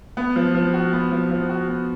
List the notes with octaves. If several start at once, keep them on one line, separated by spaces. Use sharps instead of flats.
B3
F3
F3
F#4
B3
F3
F3
F#4
B3